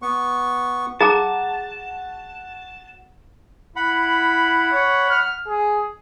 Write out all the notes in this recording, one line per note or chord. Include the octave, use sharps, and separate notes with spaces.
B3 C#6
F#4 G#4 A5 A#5 D6
E4 F#5 B5
C#5
F6
G#4